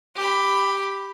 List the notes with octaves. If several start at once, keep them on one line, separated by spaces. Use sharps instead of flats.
G4 B5